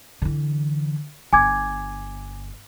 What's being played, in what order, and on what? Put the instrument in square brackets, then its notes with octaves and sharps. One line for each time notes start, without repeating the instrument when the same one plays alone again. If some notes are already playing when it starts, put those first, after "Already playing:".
[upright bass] D3 E3
[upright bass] G1 [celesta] G#5 D6 G#6